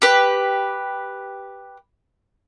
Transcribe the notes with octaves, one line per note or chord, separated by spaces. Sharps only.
G4 B4